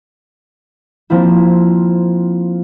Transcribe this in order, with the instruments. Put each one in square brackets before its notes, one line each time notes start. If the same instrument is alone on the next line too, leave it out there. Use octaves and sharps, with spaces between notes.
[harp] F3 A#3 C4 E4